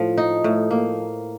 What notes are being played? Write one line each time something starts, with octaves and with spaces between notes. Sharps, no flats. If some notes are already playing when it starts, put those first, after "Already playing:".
Already playing: A2 F3
D#4
A2
A#3